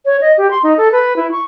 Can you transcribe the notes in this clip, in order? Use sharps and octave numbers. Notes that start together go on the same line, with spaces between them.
C#5
D#5
G4
C6
D#4
A4
B4
E4
C#6